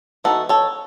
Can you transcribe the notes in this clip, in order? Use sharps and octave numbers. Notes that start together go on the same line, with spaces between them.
E3 B3 D#4 F#4 A4
A4 C#5